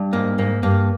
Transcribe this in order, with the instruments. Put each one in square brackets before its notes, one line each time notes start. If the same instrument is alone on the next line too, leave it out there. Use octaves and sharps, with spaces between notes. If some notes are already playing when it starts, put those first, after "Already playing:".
Already playing: [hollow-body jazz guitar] G2
[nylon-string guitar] G#2 [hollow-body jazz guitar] A#3
[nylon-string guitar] G#2 [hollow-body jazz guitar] A#3
[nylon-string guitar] G2 [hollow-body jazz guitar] A#3